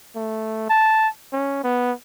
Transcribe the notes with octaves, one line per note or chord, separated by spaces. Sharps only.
A3
A5
C#4
B3